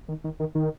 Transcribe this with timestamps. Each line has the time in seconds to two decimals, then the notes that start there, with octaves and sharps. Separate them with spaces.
0.08 D#3
0.24 D#3
0.40 D#3
0.55 D#3